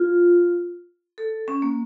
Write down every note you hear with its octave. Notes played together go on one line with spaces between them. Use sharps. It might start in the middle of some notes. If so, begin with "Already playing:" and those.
Already playing: F4
A4
C#4
A#3